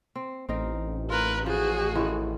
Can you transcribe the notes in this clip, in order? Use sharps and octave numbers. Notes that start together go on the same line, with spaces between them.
C4
A1 C4 D#4 A#4
F4 A#4 B4
F3 F#4 G#4
A2 D#3 F4